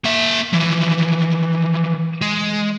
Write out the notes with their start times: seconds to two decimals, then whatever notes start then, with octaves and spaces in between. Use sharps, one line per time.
0.04 A#3 E5
0.53 E3 F3
2.22 G#3